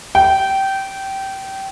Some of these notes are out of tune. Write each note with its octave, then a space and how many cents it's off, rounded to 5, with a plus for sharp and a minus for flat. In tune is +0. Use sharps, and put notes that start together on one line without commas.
G5 -20